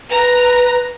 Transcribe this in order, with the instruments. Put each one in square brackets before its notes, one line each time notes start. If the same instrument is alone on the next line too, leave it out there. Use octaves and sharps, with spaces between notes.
[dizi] B4 [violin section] A#5